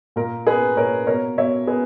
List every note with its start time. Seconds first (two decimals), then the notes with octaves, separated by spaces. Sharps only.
0.16 A#2 A#4
0.46 A#3 G#4 B4
0.77 A#2 A#4 C#5
1.07 B2 A#4 C#5
1.37 B2 C#5 E5
1.67 B3 G#4 B4